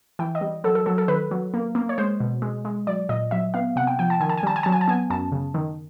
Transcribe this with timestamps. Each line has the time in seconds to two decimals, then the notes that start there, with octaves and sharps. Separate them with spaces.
0.19 E3 G5
0.35 D#5
0.41 G3
0.64 F#3 A4
0.75 A4
0.86 F#3 A4
0.98 A4
1.08 D#3 B4
1.31 F#3
1.54 A#3
1.75 A#3
1.89 C#5
1.98 G#3 C5
2.20 B2
2.42 G#3
2.65 G#3
2.87 F#3 D5
3.09 A#2 D#5
3.31 F#3 E5
3.54 B3 F5
3.76 C3 F#5
3.87 G5
3.99 F3 G5
4.10 A5
4.20 D#3 G#5
4.30 A5
4.38 G#5
4.43 G3 A5
4.56 G#5
4.63 F#3 A5
4.72 G#5
4.81 A5
4.88 B3 G#5
5.10 F#2 A5
5.32 C#3
5.54 D#3